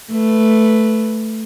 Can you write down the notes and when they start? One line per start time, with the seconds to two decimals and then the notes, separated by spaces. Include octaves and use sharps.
0.12 A3 B4